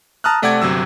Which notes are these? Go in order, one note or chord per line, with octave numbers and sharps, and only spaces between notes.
A5 A#5 D#6 F6 F#6
C3 A3 D5 F#5 D6 G#6
G1 C3 F#3 E6